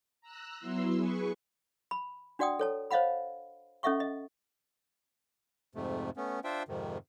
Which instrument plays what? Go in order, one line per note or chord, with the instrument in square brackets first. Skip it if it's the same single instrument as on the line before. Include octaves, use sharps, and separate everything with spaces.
[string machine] A#5 E6 F#6
F#3 B3 E4 C6 E6
G#4 B4 C#6
[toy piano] B5
D4 F#4 D5 F#5 G5 D#6
A4 C#5 A5
C5 C#5 D#5 F5 F#5 B5
C#4 A4 D#5 E5 F#5 C#6
D#5
[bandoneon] F2 G#2 C3 A3
A3 B3 C#4
D4 F4 C5 E5 G5
F2 G#2 C3 D#3